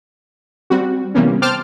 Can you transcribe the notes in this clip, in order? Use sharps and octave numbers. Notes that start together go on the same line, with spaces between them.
G3 C4 F#4
C3 E3 G3 A#3 B3 C#4
C5 G5 A5 C6 D6 F6